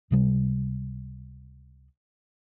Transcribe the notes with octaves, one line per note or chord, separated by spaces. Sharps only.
C#2 C3 G3